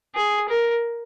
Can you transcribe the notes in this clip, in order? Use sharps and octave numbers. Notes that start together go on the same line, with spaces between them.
G#4
A#4